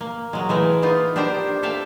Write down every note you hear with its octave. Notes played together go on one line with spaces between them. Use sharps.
A#3
F#3 G#3
E3 G#3 A3 A#4
A#3 B3 D#4 F4
D4 G4 A#4 C5 G5
A4 E5 F5 G5 A5